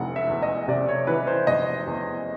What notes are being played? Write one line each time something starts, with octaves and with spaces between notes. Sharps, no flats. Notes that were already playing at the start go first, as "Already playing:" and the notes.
Already playing: F1 E3 F#5
E5
E2
D#5
C3 D5
C#5
E3 B4
C5
F1 D#5
E2